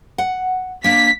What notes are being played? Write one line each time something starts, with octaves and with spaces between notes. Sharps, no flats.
F#5
A#3 D4 B6